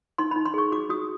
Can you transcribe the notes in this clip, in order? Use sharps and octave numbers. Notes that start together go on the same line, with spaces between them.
D#4 C6
D#4 B5
C6
G#4 C#6
F#4 D6
F#4 D#6